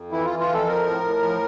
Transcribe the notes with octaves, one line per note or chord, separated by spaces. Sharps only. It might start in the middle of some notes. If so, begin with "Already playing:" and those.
Already playing: F2
E3 E4
E3 F4
F4
F2 A4
F3 A#4
A2
A2
F3